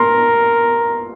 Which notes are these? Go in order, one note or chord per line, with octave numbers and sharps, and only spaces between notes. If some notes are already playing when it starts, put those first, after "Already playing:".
Already playing: A#4 C6